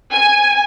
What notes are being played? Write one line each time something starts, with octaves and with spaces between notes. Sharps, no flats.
G#5